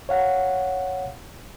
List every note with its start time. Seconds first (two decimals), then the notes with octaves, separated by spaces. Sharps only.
0.09 C#5 F5 F#5